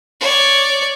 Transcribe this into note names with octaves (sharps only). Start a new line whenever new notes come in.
C#5 D5